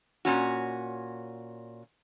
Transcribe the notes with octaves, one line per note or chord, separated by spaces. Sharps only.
A#2 C#4 F#4